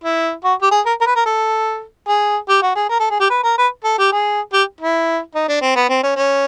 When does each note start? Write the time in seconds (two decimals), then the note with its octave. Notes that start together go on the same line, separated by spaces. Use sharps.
0.04 E4
0.44 F#4
0.62 G4
0.71 G#4
0.86 A#4
1.01 A#4
1.06 B4
1.16 A#4
1.26 A4
2.08 G#4
2.49 G4
2.62 F#4
2.75 G#4
2.89 A#4
3.00 A4
3.10 G#4
3.20 G4
3.30 B4
3.44 A#4
3.58 B4
3.84 A4
3.98 G4
4.12 G#4
4.53 G4
4.80 E4
5.35 D#4
5.48 D4
5.61 C4
5.76 B3
5.89 C4
6.03 C#4
6.16 C#4